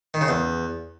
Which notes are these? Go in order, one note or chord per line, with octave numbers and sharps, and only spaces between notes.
D#3
C#3
E2